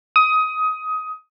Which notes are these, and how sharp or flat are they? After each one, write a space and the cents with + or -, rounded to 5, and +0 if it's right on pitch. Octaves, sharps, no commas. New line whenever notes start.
D#6 +20